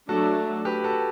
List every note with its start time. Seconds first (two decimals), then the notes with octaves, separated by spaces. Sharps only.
0.09 F#3 A3 D4 F#4 A4
0.65 G4 B4
0.84 F#4 A4